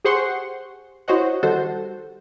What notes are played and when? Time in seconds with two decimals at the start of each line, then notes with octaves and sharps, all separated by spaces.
0.04 G4 G#4 C5 F#5 C6 C#6
1.08 E4 F#4 C5 C#5 D#5 F#5
1.43 D#3 G3 F#4 A4 C5